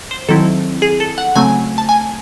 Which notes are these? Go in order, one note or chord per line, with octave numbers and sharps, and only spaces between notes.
C5
D#3 F#3 C4 E4 A4
G#4
A4
F#5
C#3 F#3 A3 C4 G#5
A5
G#5